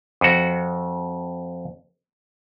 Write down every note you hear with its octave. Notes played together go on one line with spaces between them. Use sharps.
F2 F#4